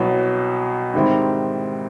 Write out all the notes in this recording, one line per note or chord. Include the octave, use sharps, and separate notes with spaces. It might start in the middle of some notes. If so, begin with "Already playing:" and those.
Already playing: C2 B2 F#3
G#2 D#3 G3 C4 E4